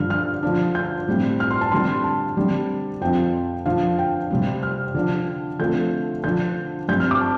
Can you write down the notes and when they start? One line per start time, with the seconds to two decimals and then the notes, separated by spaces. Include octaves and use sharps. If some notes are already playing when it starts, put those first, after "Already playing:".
Already playing: G2 D3 F3 F6
0.10 F6
0.43 D3 F3 D4
0.75 G6
1.08 A2 G3 C4
1.40 F6
1.51 C6
1.61 A5
1.72 D3 G3 C4 C6
2.04 A5
2.37 D3 G3 C4
3.01 F2 F3 C4 G5
3.66 D3 F3 D4 F5
3.99 G5
4.30 C3 G3 C4
4.63 F6
4.94 D3 F3 D4
5.59 D3 F3 A3 C4 G6
6.24 D3 F3 D4 G6
6.88 G2 G3 C4 G6
7.00 F6
7.11 D6
7.21 A5